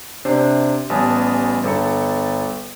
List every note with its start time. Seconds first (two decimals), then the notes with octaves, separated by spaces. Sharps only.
0.25 C3 D4 C5
0.90 A1 G3 B3 G#5 A5 D#6
1.64 G1 A4 C#7